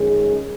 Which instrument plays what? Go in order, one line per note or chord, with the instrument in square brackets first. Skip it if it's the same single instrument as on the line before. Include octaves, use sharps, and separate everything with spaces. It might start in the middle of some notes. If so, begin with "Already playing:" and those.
Already playing: [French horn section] F#2 D#3 G#3 C#4 G#4